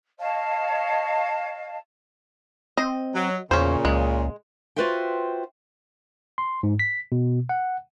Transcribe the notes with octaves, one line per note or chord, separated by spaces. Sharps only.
C#5 D#5 F5 A5
C4 D#5
F#3
E2 A#2 C#3 C#4 C5
C#2 G#3
F4 F#4 B4 C5 E5 G5
C6
G#2
B6
B2
F#5